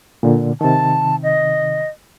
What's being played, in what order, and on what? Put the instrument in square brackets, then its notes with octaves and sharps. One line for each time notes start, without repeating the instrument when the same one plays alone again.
[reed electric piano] A#2 D3
[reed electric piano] C3 D#3 [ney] A5
[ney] D#5